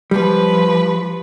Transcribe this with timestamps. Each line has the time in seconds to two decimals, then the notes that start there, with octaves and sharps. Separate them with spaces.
0.11 F3 G3 B4